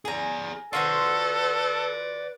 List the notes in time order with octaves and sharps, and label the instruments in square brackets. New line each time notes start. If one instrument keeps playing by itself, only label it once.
[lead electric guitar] G#4 D5 [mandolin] G#5 A#5
[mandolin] F4 F#4 C5 [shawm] A4 [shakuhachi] B4 [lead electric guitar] D5 F#5